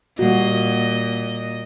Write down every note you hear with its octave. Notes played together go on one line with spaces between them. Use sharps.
A#2 G3 F#4 D#5